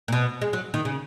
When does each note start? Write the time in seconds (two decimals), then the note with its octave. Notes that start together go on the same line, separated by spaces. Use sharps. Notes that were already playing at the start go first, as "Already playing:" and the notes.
0.08 A#2
0.12 B2
0.41 G#3
0.53 F#3
0.74 D#3
0.85 C#3